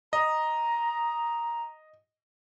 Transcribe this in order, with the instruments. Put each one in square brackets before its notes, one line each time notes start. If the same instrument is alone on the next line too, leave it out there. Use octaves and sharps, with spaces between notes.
[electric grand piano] D#5 [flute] A#5